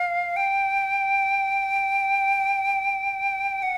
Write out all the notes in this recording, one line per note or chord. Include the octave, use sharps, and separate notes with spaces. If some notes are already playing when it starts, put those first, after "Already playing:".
Already playing: F5
G5
F#5